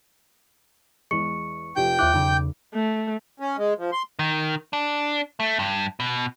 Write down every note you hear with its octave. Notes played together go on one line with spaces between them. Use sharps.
E2 G#3 C#6 C#7
F1 F3 G4 G5 G6
D#2 F4 E5 D6 F#6
B1 E2 C#3
A3
C#4
G#3
F3
C6
D#3
D4
A3
G2
B2